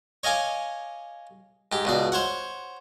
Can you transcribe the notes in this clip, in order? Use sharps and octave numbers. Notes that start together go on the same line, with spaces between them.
C#5 D#5 F5 G#5 D6
G#2 G4
C#2 B2 D5
C5 C#5 F#5